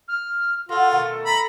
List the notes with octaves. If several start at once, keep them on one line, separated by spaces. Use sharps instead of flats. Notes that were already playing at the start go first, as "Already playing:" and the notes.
F6
F4 F#4 A4 F#5
B2 D#3 A3
A#5 B5